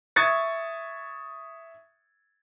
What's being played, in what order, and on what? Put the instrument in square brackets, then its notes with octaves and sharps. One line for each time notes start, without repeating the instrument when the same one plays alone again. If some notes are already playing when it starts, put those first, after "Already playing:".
[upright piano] E5 C#6 D#6 G#6 A6 C#7